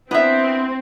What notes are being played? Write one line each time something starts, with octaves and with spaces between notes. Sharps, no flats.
B3 C4 D4 E4 E5